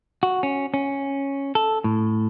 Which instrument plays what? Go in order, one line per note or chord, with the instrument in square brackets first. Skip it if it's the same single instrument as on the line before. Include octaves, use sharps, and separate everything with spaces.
[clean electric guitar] F#4
C#4
C#4
A4
A2